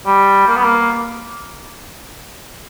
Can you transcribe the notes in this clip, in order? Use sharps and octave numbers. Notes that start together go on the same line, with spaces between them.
G3
A#3
B3
A#3